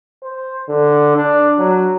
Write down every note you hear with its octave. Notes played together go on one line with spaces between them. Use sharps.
C5
D3
D4
F#3